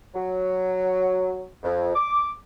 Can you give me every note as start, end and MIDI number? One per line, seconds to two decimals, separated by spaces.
0.15 1.45 54
1.63 1.94 41
1.95 2.30 86